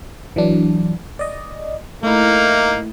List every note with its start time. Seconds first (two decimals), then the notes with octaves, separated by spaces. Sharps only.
0.36 E3 F#3 D4
1.19 D5 D#5
2.03 A3 A#3 D#4 E4